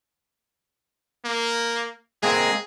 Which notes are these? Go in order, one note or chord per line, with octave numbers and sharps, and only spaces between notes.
A#3
G#3 A#3 C4 G#4